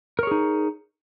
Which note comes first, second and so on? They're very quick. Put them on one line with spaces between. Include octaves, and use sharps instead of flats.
A#4 C#5 G#4 D#4